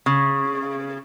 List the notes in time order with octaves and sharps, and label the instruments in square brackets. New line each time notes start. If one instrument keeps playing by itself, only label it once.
[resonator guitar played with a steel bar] C#3